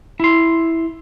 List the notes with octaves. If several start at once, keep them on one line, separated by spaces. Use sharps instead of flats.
E4 C6